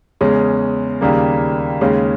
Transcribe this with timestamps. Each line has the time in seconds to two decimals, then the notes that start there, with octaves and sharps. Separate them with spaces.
0.21 E2 C#3 G#3 C#4
1.01 D#2 C#3 G3 A#3
1.81 D#2 C#3 G#3 C#4